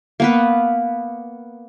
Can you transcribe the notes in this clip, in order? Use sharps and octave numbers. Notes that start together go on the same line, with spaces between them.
A#3 B3 B4